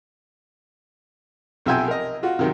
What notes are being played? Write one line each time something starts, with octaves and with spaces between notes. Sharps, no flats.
B1 C3 F3 E5 G5 G#5
A#4 D#5
F4 F#4
C3 D#3 F#3